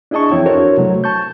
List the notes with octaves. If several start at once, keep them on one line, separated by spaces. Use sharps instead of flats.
D4 E4 G#4 D#5 A5 C#6
E2 F3 C4 E4 C#5 G5
D4 F#4 A4 A#4 C5 C#5
C3 F#3 A3
A5 C#6 G6